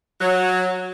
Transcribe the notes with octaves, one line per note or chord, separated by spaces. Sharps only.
F#3